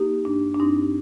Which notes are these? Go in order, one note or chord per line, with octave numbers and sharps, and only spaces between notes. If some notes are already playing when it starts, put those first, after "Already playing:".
Already playing: A#3 D#4 G4
G2 D4
D4
G2 C4 D#4